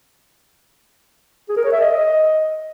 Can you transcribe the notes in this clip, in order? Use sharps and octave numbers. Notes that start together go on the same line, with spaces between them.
G#4
A#4
C#5
E5
D#5